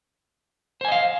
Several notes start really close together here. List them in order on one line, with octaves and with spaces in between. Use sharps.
C5 G#5 D#5 F5